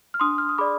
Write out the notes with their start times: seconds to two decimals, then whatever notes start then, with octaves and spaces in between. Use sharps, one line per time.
0.14 F6
0.20 D4 C6 D#6
0.38 F6
0.49 D#6
0.58 G#4 D5 B5 D6